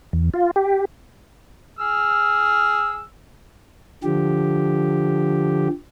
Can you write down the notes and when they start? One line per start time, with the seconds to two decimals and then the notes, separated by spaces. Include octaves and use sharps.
0.13 E2
0.34 F4
0.56 G4
1.79 G#4 E6 F6
4.04 D3 F3 G4